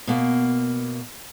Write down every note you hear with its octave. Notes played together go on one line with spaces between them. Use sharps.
B2 A#3